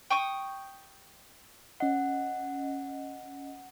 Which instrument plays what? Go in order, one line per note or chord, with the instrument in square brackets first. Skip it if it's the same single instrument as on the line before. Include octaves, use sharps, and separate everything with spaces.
[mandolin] G5 C#6 D#6
[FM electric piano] C#4 D#5 [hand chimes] F#5